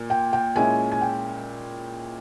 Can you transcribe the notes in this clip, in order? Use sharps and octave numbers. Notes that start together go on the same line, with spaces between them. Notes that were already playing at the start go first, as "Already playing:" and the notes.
Already playing: A#2
G5
G5
A#2 G#3 C#4 E4 G#5
G#5
G5